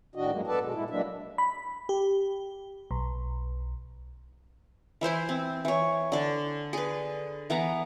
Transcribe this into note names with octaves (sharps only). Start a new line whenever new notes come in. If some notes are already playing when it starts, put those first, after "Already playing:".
A2 D#3 D4 F#4 D#5
G2 F#3 G#3 A#3
G2 B3 A4 B4 D5 A5
G#2 B2 G#3
A#2 G#3 E4
F#3 G#3 A#3 D4 E5
B5
G4
B1
E3 E4 C5 C6
C4
E3 C#5
D3 D5
G#4 B4
E3 B3 F#5 A#5